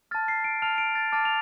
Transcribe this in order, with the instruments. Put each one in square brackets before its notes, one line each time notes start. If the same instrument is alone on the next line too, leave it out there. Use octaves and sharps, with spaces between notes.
[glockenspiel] A5 F6 A6
C7
D7
A5 F6 F7
D7
A6
A5 D6 F6 A6
F7